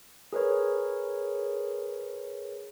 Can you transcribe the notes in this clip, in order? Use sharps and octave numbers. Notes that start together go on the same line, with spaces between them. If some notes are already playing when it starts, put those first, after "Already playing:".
G#4 A#4 B4 C#5